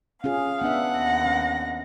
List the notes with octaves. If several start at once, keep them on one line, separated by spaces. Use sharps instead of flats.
C#4 F4 G#4 F5
B3 D4 E5 F#5
D#2 A#6
C#4